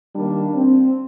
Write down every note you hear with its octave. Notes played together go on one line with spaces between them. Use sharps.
D#3 G3 A#3 D4
C4